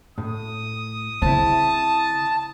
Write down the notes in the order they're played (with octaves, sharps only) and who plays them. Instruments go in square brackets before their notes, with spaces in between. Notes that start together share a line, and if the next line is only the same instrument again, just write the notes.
[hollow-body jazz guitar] A2 [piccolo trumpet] D#6
[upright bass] C#3 [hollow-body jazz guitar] C4 E4 [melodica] A5